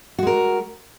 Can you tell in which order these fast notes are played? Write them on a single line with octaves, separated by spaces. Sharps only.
F#4 G#3 A#4